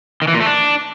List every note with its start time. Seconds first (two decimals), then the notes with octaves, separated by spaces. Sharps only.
0.22 D#3
0.28 E3
0.34 A#2
0.40 A3
0.46 D4